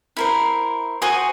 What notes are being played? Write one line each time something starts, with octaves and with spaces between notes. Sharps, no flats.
E4 A#4 C5
F#4 C5 G#5 D#6